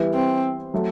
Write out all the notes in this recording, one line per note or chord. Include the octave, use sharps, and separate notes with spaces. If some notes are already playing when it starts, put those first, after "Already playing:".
Already playing: E3 G3 B3 E4
C4
F#3 A3